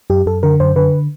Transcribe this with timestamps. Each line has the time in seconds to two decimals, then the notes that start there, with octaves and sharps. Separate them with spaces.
0.10 F#2 G4
0.26 F#2 A4
0.43 D3 A#4
0.60 F#2 C5
0.76 D3 B4